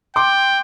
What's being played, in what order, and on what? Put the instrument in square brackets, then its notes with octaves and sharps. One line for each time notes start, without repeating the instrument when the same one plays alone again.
[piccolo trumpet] G5 [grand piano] C6 D6